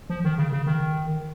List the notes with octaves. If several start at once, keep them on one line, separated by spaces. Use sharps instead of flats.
F3
D#3
C#3
C#3
D#3